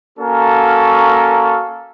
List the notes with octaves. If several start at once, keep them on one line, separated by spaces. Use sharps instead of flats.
A#3 C#4 F#4 A4 A#4 F5